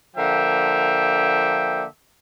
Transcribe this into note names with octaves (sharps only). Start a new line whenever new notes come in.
D3 F3 A#3 E5 G5